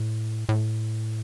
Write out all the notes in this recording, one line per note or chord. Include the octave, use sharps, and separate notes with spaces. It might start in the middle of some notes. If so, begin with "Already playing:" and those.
Already playing: A2
A2